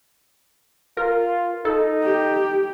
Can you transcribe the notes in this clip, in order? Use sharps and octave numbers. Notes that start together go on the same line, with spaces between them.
F4 A#4
D#4 A4
G4